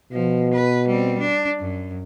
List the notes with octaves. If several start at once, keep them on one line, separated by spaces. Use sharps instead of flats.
B2 F3
B4
G3 C4
D4
F#2